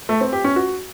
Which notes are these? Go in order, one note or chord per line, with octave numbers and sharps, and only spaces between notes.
A3
C4
G4
C#4
F#4